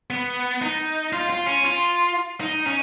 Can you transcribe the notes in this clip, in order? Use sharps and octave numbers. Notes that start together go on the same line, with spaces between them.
B3
D#4
F4
F4
C#4
F4
D#4
C#4